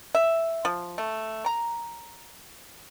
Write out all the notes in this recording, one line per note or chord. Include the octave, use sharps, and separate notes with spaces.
E5
F3
A3
A#5